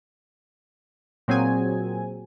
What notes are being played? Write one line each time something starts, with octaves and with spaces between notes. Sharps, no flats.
A#2 F#3 C4 G#4 G#5